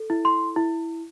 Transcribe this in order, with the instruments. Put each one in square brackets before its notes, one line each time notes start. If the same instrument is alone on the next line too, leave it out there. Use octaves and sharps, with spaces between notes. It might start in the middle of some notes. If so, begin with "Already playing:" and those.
Already playing: [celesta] A4
E4
C6
E4